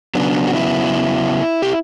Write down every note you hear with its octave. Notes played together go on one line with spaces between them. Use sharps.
C#3 F#3 B3 D4
F#4
E4
G4